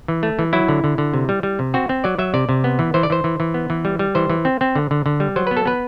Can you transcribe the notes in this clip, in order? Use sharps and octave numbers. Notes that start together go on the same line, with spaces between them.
E3
A3
E3
F#3 E4
D3
D3
D3
C3
G3
G3
C3
C4 F#4
C4
F#3 D5
F#3 E5
C3 D5
C3
B3
E3
E3 C5
D5
E3 C5
E3
E3
B3
E3
G3
G3
E3 C5
E3
C4
C4
D3
D3
D3
G3
F#3 C5
B3 B4
A4
B3 B4